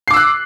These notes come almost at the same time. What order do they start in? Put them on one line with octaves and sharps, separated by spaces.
C7 D6 E6 F#6